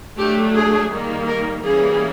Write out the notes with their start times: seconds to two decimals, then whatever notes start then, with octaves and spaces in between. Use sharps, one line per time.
0.18 F#3 A3 D4 G4
0.55 G#4
0.90 D#3 G3 A#3
1.27 A#4
1.63 E3 G3 A#3 C#4 G#4